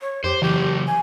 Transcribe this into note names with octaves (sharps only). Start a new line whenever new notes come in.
C#5
F2 G4 C5
C#3 E3 F#3 G4
G#5